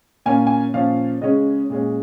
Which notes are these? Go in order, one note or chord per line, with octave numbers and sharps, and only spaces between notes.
A#2 A#3 C#4 G#5
G#5
A#2 F3 C#4 F5
C#3 G#3 C#4 D#5
A#2 G#3 C#4